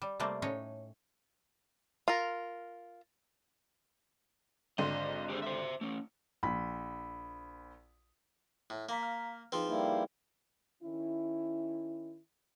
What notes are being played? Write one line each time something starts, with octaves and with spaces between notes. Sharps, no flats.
G3
C3 G3 A3 A#3 C4
A2 C#4 D#4 C#5
F4 A#4
G#1 D3 D#5 C6
G4 G#4 C5
C5 E5
A3 C#4
A#1 B5
A2
A#3 F5 A#5 B6
F6
F3 C4 D#4 G#4 B4
G3 A#3 E4
D#3 C#4 E4